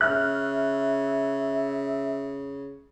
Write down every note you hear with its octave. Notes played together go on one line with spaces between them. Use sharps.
C#3 E5 F6 F#6